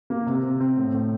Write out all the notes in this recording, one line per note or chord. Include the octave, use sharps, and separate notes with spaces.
A#3
C3
C3
C4
A2
A2